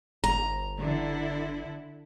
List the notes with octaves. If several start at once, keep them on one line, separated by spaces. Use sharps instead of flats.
G1 A#5
D3 E4